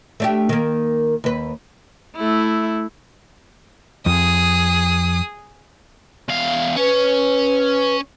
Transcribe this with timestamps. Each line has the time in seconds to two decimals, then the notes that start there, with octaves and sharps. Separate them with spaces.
0.20 A3 D4 G4
0.49 D#3 A#3
1.24 D#2 B4
2.16 A3 E4
4.06 F2 G#4 D#6
6.28 E2 F5
6.77 C#4 B4 C#5